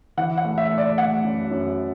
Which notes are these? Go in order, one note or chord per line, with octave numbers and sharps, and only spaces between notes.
E3 F#5
F#5
A3
E5
A3
D5
A3 F#5
F#2
F#2